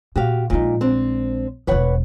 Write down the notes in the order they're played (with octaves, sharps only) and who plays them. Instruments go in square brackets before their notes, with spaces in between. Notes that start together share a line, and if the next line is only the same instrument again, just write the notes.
[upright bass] A#2 [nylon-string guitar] F#4 G4 F5
[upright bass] A#1 G#3 [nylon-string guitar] A#2 D#4
[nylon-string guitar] C4 D4
[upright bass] E1 E2 [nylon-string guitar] B4 C#5 F#5